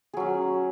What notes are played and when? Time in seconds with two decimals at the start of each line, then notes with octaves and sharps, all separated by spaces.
0.13 G#4
0.17 F#3
0.20 C#4